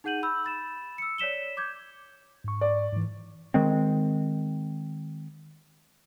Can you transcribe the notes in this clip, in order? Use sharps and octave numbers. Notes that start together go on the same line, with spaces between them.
D#4 G#4 F#5 G6 D#7 F#7
B5 E6 G6
B5 A6 E7
E6 C#7
C#5 D5 B6 E7 G7
D6 G6 G#6
G#2 C#6
D5
G#2 E3
D#3 G#3 C4